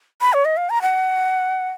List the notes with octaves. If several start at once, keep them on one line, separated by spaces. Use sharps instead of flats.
B5
C#5
D#5
F5
A#5
F#5